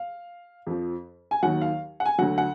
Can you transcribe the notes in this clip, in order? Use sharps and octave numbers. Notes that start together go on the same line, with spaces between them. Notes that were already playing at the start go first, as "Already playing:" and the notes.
Already playing: F5
F2 F3
G#5
D#2 D#3 F#3 F#5
F5
F#5
G#5
D2 D3 F#3 F#5
F#5